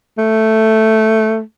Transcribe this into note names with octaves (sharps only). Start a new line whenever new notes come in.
A3